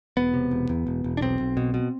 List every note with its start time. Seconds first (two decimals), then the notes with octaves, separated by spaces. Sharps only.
0.17 E1 B3
0.34 C3
0.51 E1
0.69 E2
0.87 E1
1.04 E1
1.17 D4
1.21 B1 C4
1.40 B1
1.57 B2
1.74 B2